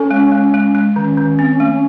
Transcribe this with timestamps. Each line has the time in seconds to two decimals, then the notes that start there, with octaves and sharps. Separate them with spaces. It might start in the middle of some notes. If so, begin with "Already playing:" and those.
Already playing: C#4 A4
0.11 G#3
0.32 G#3
0.54 G#3
0.75 G#3
0.96 D#3 C#4
1.17 D#3
1.39 C4
1.60 A3